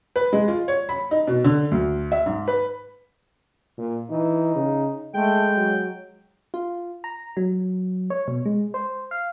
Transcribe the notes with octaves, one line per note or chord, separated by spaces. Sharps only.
B4
G#3
F4
C#5
B5
D#4
B2
D3
D2
E5
G#2
B4
A#2
E3 D#4
C#3
G#3 A3 G5
F#3
F4
A#5
F#3
C#5
B2
G#3
C5
F5